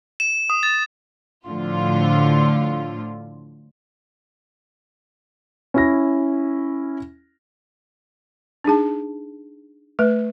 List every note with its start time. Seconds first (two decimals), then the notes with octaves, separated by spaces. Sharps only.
0.20 E7
0.50 D#6
0.63 A6
1.47 A2 D3 F3 F4
5.74 C#4 E4 A#6
8.64 D4 D#4 G#4 A5
9.99 A3 B4